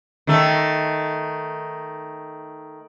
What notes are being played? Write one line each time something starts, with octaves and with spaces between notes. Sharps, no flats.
D#3 A3